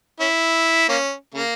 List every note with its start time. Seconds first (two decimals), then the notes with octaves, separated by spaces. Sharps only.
0.20 C#4 E4
0.88 A#3 C#4
1.34 C#3 A#3